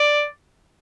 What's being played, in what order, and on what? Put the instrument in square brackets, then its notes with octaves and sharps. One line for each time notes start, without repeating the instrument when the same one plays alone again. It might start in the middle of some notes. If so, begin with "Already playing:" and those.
Already playing: [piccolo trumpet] D5